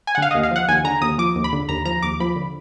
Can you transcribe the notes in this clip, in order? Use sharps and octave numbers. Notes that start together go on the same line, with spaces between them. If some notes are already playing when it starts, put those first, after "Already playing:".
G#5
F#5
D3 F5
D#5
D#2
F5
F3 F#5
D#2 G#5
D3 A#5
D#2 D#6
F3 D6
D#2
B5
D3
D#2 A#5
F3 A#5
D#2 D6
F3 B5
D3